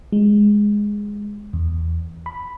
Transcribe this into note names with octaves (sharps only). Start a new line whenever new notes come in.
G#3
E2
B5